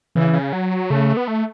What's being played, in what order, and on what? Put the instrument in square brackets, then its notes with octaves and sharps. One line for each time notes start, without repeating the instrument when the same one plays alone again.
[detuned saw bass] C#3 [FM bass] E3
[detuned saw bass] C#3
F#3
[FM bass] C#3 [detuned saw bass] A3
[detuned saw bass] B3
A3